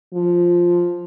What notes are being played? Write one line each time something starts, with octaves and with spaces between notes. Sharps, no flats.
F3